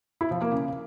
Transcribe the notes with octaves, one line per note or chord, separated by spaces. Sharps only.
E4
F3
A#3
C#3